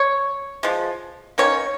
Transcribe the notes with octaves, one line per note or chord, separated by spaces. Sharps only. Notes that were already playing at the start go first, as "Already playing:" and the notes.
Already playing: C#5
F3 G#3
D#3 A#3 C#4 C#5